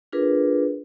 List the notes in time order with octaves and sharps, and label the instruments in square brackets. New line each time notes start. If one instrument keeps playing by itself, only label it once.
[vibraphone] D4 F4 G#4 A#4 B4